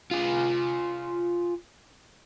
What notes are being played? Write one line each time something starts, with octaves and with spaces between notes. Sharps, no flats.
F4 G#4